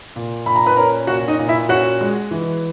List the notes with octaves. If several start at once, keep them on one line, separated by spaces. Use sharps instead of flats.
A#2
A#2 B5
A#5
B4 B5
C#4 A#4 A#5
A#2 F#4 F#5
D#4 D#5
A#2
E4 E5
C#4 F#4 F#5
G#3
E3